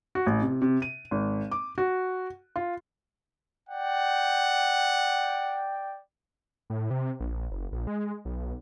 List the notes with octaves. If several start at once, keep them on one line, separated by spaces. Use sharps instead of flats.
F#4
A1
C3
C3
D#7
G#1
D6
F#4
F4
D5 F#5 G5
A2
C3
A#1
F#1
A#1
G#3
B1